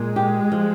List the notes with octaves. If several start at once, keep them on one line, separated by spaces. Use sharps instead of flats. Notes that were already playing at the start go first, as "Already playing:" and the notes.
Already playing: A#2 G#3
G4
F3